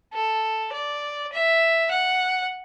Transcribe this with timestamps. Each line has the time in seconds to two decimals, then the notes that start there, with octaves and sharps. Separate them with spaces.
0.14 A4
0.73 D5
1.33 E5
1.91 F#5